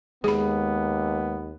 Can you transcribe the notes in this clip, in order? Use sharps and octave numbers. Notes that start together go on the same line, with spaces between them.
D#2 G#3 B3 G#4 B5